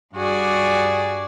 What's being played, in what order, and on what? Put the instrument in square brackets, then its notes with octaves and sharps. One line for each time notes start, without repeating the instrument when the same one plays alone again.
[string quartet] G2 F#4 G#4 D5